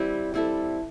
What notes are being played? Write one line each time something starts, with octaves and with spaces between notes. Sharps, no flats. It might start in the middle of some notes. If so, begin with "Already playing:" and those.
Already playing: G3 C4 E4
G3 C4 E4 A4